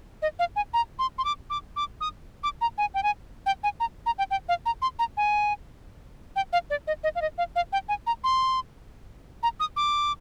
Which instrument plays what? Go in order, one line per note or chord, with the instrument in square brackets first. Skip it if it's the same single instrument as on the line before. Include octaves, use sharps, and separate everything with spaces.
[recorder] D#5
F5
G#5
A#5
C6
C6
D6
D6
D6
D#6
D6
A#5
G#5
G5
G#5
G5
G#5
A#5
A#5
G5
G5
F5
A#5
C6
A#5
G#5
G5
F5
D5
D#5
D#5
F5
D#5
F5
F5
G5
G#5
A#5
C6
A#5
D#6
D6